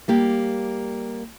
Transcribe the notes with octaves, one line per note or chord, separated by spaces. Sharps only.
G3 A#3 G4